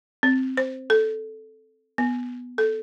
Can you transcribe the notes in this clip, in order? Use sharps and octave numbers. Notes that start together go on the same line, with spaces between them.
C4
C5
A4
B3
A4